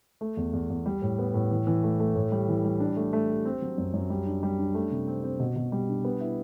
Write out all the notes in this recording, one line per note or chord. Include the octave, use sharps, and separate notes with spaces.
A3
E2
E2
E2
G3
A2
B3
A2
E3
E3
A3
A3
A2
G3
E3
G3
D4
A3
A3
G4
C4
F#3
F#2
F#2
G3
D4
G3
D4
A3
C3
C4
C4
B2
B2
G3
D4
B3
E4